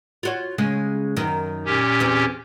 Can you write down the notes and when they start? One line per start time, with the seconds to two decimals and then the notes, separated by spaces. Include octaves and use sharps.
0.23 F4 F#4 C#5
0.58 C#3 G#3 C#4
1.16 F#2 D#3
1.65 A#2 C#4 G4
2.00 E2 C4 G#4